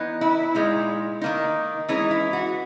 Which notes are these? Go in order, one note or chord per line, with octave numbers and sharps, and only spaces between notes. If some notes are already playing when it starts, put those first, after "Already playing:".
Already playing: E3 B3 D#4
E4
A#2 G#3 D#4
D#3 A#3 D#4
E3 G#3 C#4 D#4
E4
F#4